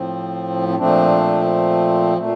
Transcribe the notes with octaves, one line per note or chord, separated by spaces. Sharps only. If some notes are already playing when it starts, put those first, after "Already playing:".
Already playing: A2 F3 C4
C4
A#2 F3 A3 C4 D4
A#2 A3